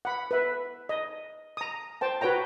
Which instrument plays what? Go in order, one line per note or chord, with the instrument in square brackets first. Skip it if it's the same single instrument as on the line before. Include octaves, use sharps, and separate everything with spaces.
[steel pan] F#5 B5
B4 E5
D#5
A#5 D#6
C5 G5 A5
F#4 B4 C#5 G5 A#5